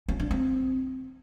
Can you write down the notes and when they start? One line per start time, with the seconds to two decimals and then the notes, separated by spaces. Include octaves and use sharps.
0.08 C#4
0.20 D4
0.31 C4